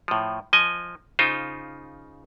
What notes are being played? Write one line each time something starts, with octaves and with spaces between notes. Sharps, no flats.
A2 F3
F3 D#5 G#5
C#3 D#4 F4 C5